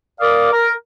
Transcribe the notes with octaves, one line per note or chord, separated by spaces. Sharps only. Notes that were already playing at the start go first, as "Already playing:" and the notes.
A#4 D5 F5 D6 D#6
A#4